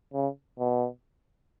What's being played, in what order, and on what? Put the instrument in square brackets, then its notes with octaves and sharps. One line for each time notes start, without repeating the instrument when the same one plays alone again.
[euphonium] C#3
B2